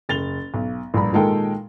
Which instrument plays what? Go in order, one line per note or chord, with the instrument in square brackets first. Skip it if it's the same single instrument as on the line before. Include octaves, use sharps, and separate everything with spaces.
[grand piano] F#1 A6 F7 G7
B1
A#1 G2 A#5 B5
A#2 D#3 G#3 A4 A#4 G5